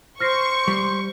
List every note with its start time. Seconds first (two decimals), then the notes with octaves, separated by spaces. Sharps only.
0.20 C5 C#6 F6 A#6 C7
0.68 G3 C6